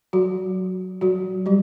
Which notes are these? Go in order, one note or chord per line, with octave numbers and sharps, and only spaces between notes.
F#3 F#4
F#3 F#4
G3 G4